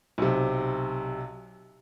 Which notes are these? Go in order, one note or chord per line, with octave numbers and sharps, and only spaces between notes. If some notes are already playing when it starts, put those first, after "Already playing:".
B1 C3